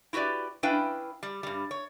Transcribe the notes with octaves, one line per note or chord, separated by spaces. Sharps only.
E4 F#4 G4 B4 D5
C#4 D4 E4 B4 F5 G5
G3
G2 G3
C#5